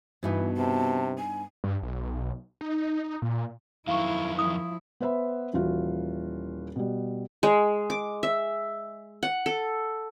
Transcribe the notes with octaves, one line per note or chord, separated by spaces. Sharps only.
G2 B2 E3 B3 D#4
C3 A5
G#5
G2
B1
D#4
A#2
F2 D#3 F#3 E4 F5 C#6
F3 E4 D#6
B3 B4 C5 E5 F#5 B5
D#1 E3 F4 F#4
B2 G3
G#3
D6
E5
F#5
A4